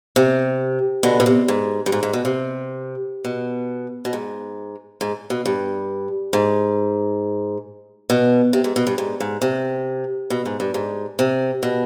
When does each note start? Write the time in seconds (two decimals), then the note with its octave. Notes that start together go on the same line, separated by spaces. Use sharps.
0.16 C3
1.03 B2 D3
1.20 B2
1.26 C3
1.48 G#2
1.86 G2
1.92 G#2
2.03 G#2
2.13 B2
2.25 C3
3.25 B2
4.05 B2
4.13 G#2
5.01 G#2
5.30 B2
5.46 G2
6.33 G#2
8.10 B2
8.53 C3
8.64 G#2
8.76 B2
8.87 G2
8.98 G#2
9.20 G#2
9.42 C3
10.30 B2
10.46 G#2
10.60 G2
10.74 G#2
11.19 C3
11.63 B2